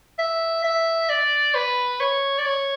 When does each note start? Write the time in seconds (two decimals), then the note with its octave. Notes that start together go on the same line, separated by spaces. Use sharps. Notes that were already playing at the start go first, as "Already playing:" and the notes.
0.19 E5
0.64 E5
1.09 D5
1.55 B4
2.00 C#5
2.38 D5
2.45 C#5